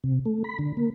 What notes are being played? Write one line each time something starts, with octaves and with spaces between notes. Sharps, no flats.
C3
A3
B5
D3
A#3